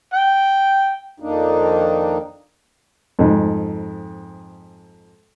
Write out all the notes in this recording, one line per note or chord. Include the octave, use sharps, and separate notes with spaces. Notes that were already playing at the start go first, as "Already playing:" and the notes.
G5
F2 D#3 A#3 D4 D#4
F2 G#2